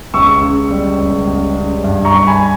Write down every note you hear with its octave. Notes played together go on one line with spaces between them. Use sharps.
C#2 C#6 E6
C#3
G3
C#2
C#2
C#3
G2
A#5 C#6
G3
G#5 B5